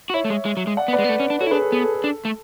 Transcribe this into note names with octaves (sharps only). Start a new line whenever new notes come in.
F#4
E4 C#5 E5
A3
G#3
G#3
F#3
G#3
D5 F#5
B3
B4 D5
G#3
B3
A3
C#4
D4
F#4 A4 C#5
E4
D4 G#4 B4
A4
B3 G#4
A4
A4
D4
A3